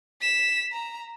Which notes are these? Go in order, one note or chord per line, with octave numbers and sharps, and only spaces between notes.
B6 E7
A#5